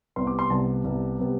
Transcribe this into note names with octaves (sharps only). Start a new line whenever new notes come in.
C2 C3 G3 B3 C6
D6
C6
C2 C3 G3 B3 A5
C2 C3 G3 B3
C3 G3 B3